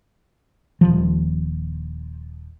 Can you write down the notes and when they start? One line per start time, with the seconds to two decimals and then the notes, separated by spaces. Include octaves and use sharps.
0.81 D#1 F3